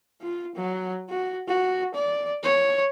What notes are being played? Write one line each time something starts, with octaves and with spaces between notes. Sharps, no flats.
F4
F#3
F#4
F#4
D5
C#5